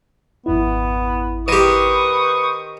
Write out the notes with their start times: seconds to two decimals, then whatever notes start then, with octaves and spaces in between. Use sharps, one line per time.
0.46 G#1 F2 B3 E4
1.48 D#3 G4 B4 C5 C#6 D#6